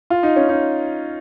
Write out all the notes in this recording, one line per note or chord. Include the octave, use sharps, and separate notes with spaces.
F4
D#4
C#4
D#4